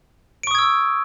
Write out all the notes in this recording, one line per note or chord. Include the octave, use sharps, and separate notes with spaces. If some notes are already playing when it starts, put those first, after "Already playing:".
C#6 D#6 E6 G#6 D7